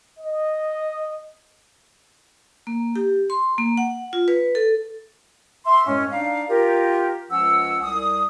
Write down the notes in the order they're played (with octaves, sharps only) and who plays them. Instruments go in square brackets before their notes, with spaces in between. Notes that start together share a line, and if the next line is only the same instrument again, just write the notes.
[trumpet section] D#5
[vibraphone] A#3
G4
C6
A#3
F#5
F4
B4
A4
[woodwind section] E5 C6
F#2 A2 G#3 C#4
D4 D#4 D5 F5
F4 G4 A#4
C#2 F3 C#4 F#5 E6
C2 D#6